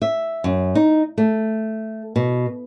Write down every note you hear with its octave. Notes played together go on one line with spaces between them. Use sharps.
E5
F#2
D#4
A3
B2